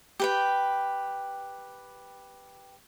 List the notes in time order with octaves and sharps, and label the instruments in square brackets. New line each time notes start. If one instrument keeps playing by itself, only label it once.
[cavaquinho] G4 B4 G5